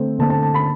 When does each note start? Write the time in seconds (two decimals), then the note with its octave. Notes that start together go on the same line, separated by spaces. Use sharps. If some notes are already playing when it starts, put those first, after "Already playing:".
Already playing: D3 A3 C4
0.19 D3 A3 C4 A5
0.30 A5
0.43 A5
0.54 B5